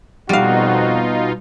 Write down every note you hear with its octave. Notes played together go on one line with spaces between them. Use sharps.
F2 B2 G3 D#4 F4 F#4 F5